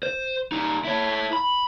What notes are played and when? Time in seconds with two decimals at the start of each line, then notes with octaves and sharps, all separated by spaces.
0.03 C5
0.52 G3 D#4
0.85 E4 C#5
1.33 B5